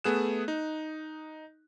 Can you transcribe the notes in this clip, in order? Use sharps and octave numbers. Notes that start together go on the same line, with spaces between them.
A3 B3 G#4 F#6 E7
D#4